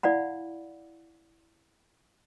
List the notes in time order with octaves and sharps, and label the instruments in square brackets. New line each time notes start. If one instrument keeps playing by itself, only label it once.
[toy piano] E4 D5 F5 F#5 B5